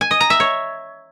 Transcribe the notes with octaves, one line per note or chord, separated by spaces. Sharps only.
G#5
D#5
A#5
E5
C#5